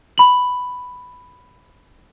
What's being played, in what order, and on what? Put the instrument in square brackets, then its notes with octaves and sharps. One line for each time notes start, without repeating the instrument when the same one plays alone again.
[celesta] B5 F#7